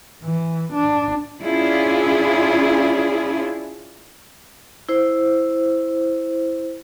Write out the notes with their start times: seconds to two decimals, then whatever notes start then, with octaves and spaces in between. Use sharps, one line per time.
0.24 E3
0.73 D4
1.42 C#4 D4 E4 F4 G#4
4.89 E4 C5